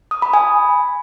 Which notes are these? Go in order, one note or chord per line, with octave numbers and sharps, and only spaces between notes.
D#6
B5
G#5